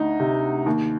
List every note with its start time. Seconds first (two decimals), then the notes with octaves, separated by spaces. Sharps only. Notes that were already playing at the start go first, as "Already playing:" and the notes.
Already playing: D2 D#4
0.20 C3
0.66 D#2